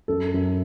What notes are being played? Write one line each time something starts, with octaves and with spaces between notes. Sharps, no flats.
F#2 A4
F#2